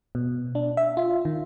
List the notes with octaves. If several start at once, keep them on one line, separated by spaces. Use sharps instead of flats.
B2
D4
E5
F4
D#3